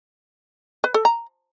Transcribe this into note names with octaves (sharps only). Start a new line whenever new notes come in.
B4
A4
A#5